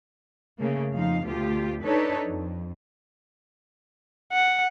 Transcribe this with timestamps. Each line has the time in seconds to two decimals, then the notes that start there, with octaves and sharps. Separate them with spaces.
0.59 C#3 A3 A#3
0.91 F2 F3 D#4 F5
1.23 D2 B2 F4 G4
1.83 D4 D#4 A4 B4 C#5
2.26 F2
4.33 F#5